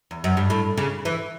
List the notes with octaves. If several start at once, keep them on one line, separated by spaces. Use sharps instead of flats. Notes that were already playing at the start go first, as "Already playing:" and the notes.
E2
F#2
G2
A2
C#3
E3